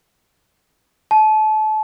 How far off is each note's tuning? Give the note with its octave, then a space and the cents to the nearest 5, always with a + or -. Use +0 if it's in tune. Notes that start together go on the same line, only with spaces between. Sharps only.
A5 -30